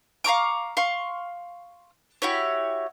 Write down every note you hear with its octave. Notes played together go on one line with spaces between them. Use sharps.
F5 A#5 C#6 D6
F5 C6 C#6
E4 F#4 G4 C#5